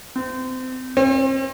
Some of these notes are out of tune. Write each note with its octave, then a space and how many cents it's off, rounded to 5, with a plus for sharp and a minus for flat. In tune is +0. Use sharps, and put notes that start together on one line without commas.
C4 -30
C4 +40